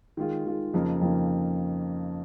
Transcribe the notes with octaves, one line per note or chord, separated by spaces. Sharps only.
D#3 G#3 F4
D#3 G#3 F4
F2 C#3 F3 A#3 D#4
F2 C#3 F3 A#3 D#4